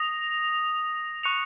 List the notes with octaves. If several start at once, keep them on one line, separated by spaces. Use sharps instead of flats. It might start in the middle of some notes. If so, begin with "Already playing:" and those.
Already playing: D#6 A#6 F7
C#6 F#6 C#7 F7